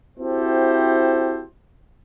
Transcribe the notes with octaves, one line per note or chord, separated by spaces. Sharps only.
C4 E4 F#4 G4 A4 C5